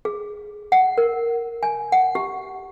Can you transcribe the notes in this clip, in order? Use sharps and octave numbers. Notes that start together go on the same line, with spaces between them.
G#4
F#5
A#4
G#5
F#5
G4